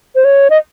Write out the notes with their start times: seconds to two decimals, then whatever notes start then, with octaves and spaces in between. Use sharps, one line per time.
0.15 C5
0.25 C#5
0.50 D#5